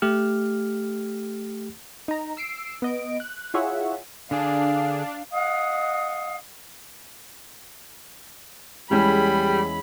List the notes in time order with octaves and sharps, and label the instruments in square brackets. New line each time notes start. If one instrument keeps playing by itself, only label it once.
[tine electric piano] A3 G4 F6
[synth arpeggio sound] D#4 A#5
E6 C7 D7
B3 D#5 D7
F#6
E4 F4 G#4 C#5 E5 F#5
[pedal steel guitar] D3 G#4 [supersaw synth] D4 [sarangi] F5
[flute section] D#5 F5 F#5 D#6
[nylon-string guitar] E2 G#3 C#4 [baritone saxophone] G3 [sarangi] B5